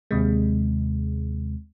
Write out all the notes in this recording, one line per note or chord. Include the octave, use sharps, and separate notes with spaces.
D#2 C3 G#3